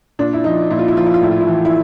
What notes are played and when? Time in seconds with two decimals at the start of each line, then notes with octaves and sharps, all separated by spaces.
0.19 A#2 D4
0.33 E4
0.44 F3 D#4
0.70 A#2 E4
0.79 F4
0.88 E4
0.95 F3 F4
1.06 E4
1.14 F4
1.22 A2 E4
1.31 F4
1.41 E4
1.47 E3
1.65 E4